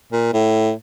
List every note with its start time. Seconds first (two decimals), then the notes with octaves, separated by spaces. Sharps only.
0.12 A#2
0.33 A2